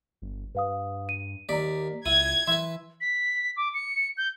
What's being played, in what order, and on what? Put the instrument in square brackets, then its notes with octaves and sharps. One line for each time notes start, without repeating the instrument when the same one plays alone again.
[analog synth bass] G1
[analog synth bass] G2 [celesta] B4 F5 D#6
[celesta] D#7
[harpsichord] D#2 D5 [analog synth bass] A#3 [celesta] A#5 B6
[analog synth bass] C#2 [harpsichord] E4 F4 [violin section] G#6 [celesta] D#7
[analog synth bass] E3 [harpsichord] B4 E5 [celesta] C6
[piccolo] B6
D6
C#7
G6